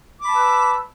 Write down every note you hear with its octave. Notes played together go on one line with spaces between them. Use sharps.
B4 A5 B5 D6 E6